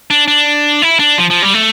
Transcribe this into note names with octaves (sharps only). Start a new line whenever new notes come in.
D4
D4
E4
D4
F3
F3
G3
A3